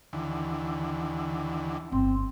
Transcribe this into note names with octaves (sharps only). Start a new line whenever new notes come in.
D#2 D3 E3
G1 C4